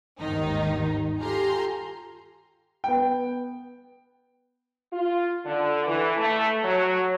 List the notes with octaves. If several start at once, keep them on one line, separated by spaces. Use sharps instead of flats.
G1 D#2 G#2 D#3 D#4
F4 G4 A4 G#5 A#5 C6
B3 G5
F4
D3
E3
A3
F#3